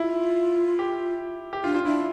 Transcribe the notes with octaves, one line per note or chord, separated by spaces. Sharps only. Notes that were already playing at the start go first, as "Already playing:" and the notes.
Already playing: E4 F4
G4
G4
D4 F4
F4
D4 E4